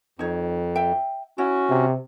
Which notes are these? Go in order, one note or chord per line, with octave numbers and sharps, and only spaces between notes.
F2 D#4 C#5
E5 G5
C#4 E4 F#4
C3